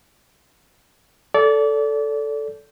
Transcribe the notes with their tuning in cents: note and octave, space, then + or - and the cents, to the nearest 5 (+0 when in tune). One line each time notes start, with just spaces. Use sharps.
A4 +0 D5 -30